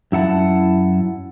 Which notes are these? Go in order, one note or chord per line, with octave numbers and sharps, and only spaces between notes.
F#2 E4 F#5 A5